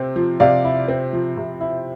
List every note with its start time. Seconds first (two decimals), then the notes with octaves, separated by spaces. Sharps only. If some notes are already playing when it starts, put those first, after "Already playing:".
Already playing: C3 C4
0.16 F3
0.40 C3 D5 F5
0.65 E4
0.88 C4
1.13 F3
1.37 C3
1.61 E4